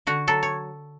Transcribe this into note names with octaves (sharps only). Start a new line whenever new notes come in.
D3 F#4
F#3 A4
C#5